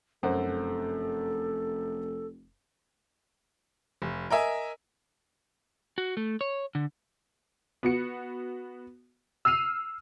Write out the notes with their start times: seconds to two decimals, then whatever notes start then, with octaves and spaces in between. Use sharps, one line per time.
0.23 F1 F#2 A4 C5 F#5
4.02 F1
4.30 A#4 D#5 E5 G#5
5.98 F#4
6.17 A3
6.41 C#5
6.75 D3
7.83 B3 F#4 C#7
9.45 E6 F6 C7 D#7 F7